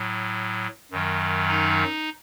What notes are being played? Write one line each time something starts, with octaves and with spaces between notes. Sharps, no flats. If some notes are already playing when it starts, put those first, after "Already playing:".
Already playing: A2 F#3
F#2 D#3 F#3
D#4